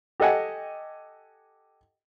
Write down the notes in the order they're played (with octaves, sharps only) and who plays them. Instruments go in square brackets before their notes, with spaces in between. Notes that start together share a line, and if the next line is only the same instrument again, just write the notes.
[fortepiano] G4 A4 D#5 F#5 G#5